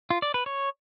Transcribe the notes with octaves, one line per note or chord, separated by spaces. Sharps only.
F4
D5
B4
C#5